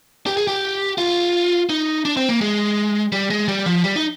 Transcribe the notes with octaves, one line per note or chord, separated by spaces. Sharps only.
G4
G#4
G4
F4
D#4
D4
C4
A#3
G#3
G3
G#3
G3
F3
G3
D#4